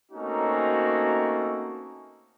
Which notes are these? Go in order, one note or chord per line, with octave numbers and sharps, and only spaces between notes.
A3 A#3 C4 C#4 D#4 F#4